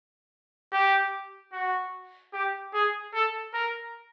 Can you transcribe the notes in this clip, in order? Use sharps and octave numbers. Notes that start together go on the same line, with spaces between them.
G4
F#4
G4
G#4
A4
A#4